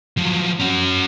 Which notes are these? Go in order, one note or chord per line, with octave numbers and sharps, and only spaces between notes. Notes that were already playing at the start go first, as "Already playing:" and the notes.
F3 F#3
C#4 F#4